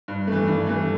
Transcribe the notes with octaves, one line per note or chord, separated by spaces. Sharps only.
G2
E3 A3
G2
E3 A3